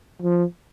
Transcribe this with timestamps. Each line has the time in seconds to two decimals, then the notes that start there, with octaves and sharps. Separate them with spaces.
0.22 F3